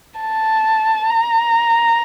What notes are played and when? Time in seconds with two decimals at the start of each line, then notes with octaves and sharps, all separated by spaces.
0.20 A5
1.10 A#5